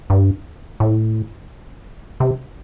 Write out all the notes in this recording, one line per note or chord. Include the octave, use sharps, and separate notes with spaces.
G2
A2
C3